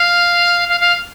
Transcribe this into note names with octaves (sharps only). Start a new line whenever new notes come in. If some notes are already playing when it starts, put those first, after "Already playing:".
Already playing: F5
F5
F5